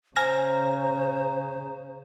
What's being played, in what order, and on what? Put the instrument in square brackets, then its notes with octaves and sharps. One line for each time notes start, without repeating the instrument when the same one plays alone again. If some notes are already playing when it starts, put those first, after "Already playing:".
[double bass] C#3 [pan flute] C5 [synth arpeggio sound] G#5 F6 A#6 [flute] A#5